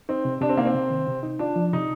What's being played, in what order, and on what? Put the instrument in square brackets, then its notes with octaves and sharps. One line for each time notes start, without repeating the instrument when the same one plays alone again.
[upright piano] C4 [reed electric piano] D#4
[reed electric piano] C3
[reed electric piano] C3 [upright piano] D4
[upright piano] C4
[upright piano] A#3 [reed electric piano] D#4
[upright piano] C4
[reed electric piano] C3
D#3
C3
D#4
[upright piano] D4 [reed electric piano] F4
[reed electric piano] F3
[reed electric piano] C3 [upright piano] D#4